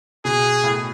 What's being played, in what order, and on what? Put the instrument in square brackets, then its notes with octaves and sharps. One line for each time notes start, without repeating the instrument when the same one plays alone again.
[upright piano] B2 [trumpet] G#4
[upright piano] A2